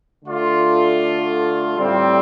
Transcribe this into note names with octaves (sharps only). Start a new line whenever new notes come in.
D3 A3 F4 D5
A2 G3 C4